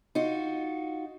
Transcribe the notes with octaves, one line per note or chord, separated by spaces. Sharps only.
D#4 F4 F#4